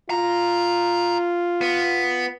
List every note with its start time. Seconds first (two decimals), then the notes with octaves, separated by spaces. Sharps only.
0.10 F4 A#5
1.61 B3